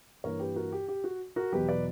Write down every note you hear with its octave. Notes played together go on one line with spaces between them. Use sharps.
G2 E3 A#3 A#4 C#5
G4 B4
F#4 A#4
G4
G4
F#4
F#4 A#4
E2 B2 F#3 G4 B4
B4 D5